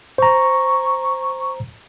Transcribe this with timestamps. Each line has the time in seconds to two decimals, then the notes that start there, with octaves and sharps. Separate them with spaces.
0.18 C5 A#5 C#6